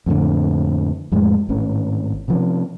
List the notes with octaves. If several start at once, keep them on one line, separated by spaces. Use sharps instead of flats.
F2 A2 D3
F2 A2 G#3
G#1 A2 C#4
C3 F3 C#4